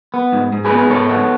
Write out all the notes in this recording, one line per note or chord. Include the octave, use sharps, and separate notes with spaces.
B3
G#2
G#2
G#4 B4
B3
G#4 B4
G#2 A4 C#5
B3